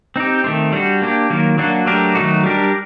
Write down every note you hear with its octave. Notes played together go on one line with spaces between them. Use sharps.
C4 D#4 G4
D#3 A3 C4
G3 D4 F#4
A#3 D4 G4
D#3 F#3 A#3
F#3 A#3 D4 F#4
F#3 A3 D4 G4 A#4
D#3 F#3 A3 D#4 F#4
G3 D4 G4 A#4